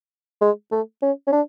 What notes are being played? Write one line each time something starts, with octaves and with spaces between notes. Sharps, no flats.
G#3
A3
C#4
C#4
D4